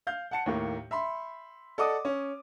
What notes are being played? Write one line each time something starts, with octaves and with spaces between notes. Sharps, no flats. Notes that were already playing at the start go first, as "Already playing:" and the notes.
F5 G6
F#5 A5 C#7
D#2 A2 A#3
E5 B5 C6
A4 D5 D#5 F#5 D6 D#6
C#4